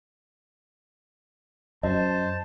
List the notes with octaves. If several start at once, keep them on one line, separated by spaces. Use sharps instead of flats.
F#2 C5 D#5 A5